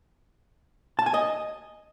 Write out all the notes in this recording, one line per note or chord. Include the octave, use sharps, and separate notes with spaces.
A5
G#5
D#5